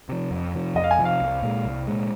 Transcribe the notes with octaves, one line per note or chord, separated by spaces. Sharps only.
C3 F3
F2
C3 F3
F2 D#5
F5
G#5
C3 F3
F5
C2
A#2 G#3
C2
A#2 G#3